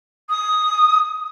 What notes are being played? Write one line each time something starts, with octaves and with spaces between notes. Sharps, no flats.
D#6